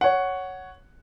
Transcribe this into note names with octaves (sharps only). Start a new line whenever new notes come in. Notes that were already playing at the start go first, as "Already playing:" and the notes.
C#5 F#5